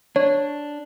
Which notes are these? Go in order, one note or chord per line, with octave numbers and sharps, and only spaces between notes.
D4 C#5